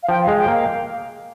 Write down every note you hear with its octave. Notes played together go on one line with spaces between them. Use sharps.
F5
F3 G5
G#3 F5
G5
A#3 F5